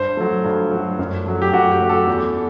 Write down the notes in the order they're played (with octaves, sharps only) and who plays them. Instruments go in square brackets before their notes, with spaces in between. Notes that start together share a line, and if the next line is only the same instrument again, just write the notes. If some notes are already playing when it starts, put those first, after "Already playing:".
Already playing: [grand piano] G2 C5
F#3 A3
G2
F#3 A3
F#2
F#3 A3
G4
F#2 F#4
G4
F#3 A3
A4
E2
A3